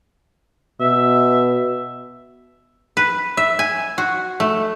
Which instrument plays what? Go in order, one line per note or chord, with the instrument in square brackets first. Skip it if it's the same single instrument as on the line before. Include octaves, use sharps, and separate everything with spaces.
[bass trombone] B2 [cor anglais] E5
[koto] B4
E5
G#5
F#4
A3